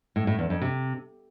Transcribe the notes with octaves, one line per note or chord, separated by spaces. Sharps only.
A2
A2
E2
F2
C3